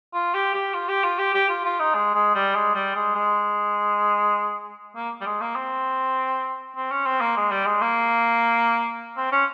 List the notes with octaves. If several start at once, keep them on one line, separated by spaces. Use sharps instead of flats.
F4
G4
G4
F4
G4
F4
G4
G4
F4
F4
D#4
G#3
G#3
G3
G#3
G3
G#3
G#3
A#3
G3
G#3
A#3
C4
C4
C#4
C4
A#3
G#3
G3
G#3
A#3
C4
C#4